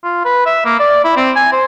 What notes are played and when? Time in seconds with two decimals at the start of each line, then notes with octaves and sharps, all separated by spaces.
0.04 F4
0.25 B4
0.46 E5
0.65 A#3
0.79 D5
1.04 E4
1.17 C4
1.36 G#5
1.52 C5